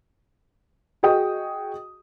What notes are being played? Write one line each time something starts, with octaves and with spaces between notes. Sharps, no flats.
F#4 G#4 D#5 G5 D#6